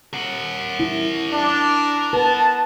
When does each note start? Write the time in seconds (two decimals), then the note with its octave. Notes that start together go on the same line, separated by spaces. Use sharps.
0.13 A#4 F#5
0.80 E4
1.31 D4
2.13 B3 B4 A5